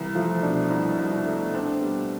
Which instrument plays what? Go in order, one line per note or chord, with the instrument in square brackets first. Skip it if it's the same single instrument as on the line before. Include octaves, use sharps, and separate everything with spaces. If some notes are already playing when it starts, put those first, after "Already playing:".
Already playing: [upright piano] C2 [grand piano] E3
[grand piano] F3 [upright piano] A3
[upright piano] B2 [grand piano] D4
[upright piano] C2 [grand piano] E4
[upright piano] C2
[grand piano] D4
[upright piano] A3
[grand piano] C4 [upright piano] D4
[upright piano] G3 [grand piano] B3